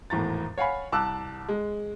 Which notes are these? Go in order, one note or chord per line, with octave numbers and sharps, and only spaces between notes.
G#1 E2 A2 A#5 A6
C#5 F5 F#5 G#5 B5
C2 A5 D6 E6 F#6
G#3